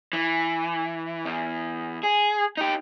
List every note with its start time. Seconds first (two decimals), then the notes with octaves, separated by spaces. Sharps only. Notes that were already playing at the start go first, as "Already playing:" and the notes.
0.13 E3
1.25 E2
2.03 G#4
2.57 D#4 G4